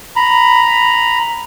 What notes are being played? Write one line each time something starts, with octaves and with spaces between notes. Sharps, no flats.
A#5 B5